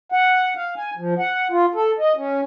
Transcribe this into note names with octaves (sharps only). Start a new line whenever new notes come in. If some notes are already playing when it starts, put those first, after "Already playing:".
F#5
F5
G#5
F3
F#5
F4
A4
D#5
C#4